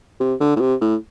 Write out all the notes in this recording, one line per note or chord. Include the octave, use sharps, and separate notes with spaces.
C3
D3
A2
C3
A2